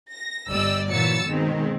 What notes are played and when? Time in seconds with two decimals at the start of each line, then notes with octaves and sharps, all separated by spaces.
0.11 A#6
0.49 G1 G3 D5 D#5 E6
0.91 A#2 E3 F#3 E6 A6 C#7
1.26 B2 D#3 G#3 C4